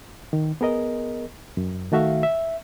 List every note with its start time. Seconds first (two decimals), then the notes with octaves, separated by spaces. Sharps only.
0.33 D#3
0.61 B3 G#4 A#4 D#5
1.57 F#2
1.92 D#3 A3 F#4 E5 F5
2.23 E5